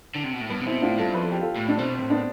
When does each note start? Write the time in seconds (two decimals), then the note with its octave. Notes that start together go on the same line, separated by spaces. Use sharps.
0.15 D3
0.23 C3
0.33 B2
0.41 A2
0.50 G2 B3
0.60 C3
0.66 B2 C4 E4
0.82 A2 D4 F4
0.98 G2 F4 A4
1.14 F2 B4
1.23 A4
1.32 G4
1.41 F4 A4
1.57 A2
1.68 D4
1.78 B2 C4
1.94 A2 C4
2.10 B3 D4